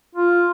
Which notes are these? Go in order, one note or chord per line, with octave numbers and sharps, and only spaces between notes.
F4